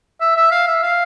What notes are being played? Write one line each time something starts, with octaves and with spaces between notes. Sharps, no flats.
E5
E5
F5
E5
F5